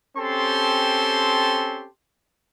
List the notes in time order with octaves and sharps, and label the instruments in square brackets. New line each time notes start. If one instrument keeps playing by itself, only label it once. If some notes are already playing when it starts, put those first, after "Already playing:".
[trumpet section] C4 C#4 G4 A4 A5 C6